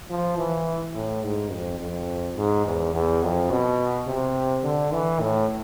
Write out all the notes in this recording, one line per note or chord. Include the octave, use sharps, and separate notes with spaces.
F3
E3
A2
G#2
F2
F2
G#2
E2
E2
F2
B2
C3
D3
E3
A2